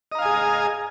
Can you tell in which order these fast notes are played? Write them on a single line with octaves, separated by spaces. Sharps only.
D#5 A#5 F5 G#5 G#4